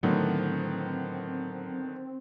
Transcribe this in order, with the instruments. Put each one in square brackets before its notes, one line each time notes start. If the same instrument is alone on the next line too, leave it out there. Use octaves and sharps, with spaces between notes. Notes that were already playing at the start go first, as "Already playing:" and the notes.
[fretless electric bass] A2 [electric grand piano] D3 D#3 B3 [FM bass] F#3 [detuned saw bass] C4